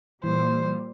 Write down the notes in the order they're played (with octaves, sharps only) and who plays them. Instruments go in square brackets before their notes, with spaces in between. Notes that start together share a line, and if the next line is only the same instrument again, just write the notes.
[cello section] A#2 G3 [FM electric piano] E3 [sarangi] C5